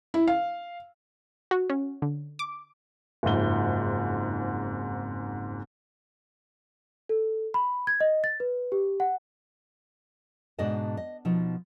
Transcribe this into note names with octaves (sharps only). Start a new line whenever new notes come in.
E4
F5
F#4
C#4
D3
D6
F#1 F2 G#2 G7
A4
B5
G#6
D#5
A6
B4
G4
F#5
G#2 B2 D4 D5 D#5 A5
D#5
B2 F3 D#4